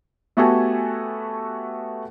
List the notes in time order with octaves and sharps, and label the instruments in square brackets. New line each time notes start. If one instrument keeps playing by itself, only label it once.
[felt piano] A3 B3 F#4 G4 A4 G#5